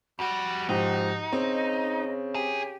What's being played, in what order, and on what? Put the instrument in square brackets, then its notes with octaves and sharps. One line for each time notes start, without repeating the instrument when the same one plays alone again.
[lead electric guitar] F2 G3 [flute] F#4
[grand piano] G#2 F3 G4 [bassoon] C4 [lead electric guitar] D#4
[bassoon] C#3 [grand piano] C4
[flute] D#5
[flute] G4 [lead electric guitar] G#4